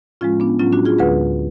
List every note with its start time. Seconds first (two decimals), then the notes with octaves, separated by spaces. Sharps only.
0.21 A2 F3 G#3 C#4 F4
0.40 B3 D4
0.59 A2 F#3 C#4 F4
0.72 D4 F#4
0.85 F4 G#4
0.98 D2 D3 G#3 G#4 B4